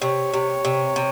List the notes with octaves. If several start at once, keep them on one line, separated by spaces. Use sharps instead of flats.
C3 C#5
C3
C3
C3